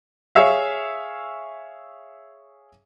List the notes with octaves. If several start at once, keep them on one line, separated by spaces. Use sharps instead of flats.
G#4 C#5 E5 F5